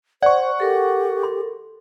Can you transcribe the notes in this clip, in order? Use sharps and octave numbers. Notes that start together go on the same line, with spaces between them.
C5 D5 F#5 C#6
G4 A4 A#4
C6